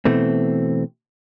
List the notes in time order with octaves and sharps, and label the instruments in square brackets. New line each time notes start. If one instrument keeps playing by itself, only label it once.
[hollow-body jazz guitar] B2 E3 A3 C4